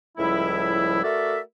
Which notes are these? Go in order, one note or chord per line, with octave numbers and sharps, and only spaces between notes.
C#2 A2 F3 G3 E4
A3 F#4 A4 A#4 D5 E5